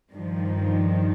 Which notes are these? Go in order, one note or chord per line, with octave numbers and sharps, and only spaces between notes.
G2 D#3 F3